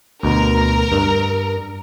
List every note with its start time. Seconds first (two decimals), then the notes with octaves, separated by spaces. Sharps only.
0.23 D2 B2 A#4
0.92 G2